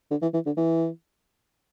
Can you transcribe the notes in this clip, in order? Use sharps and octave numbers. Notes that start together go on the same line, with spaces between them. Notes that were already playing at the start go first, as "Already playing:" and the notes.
D3
E3
E3
D3
E3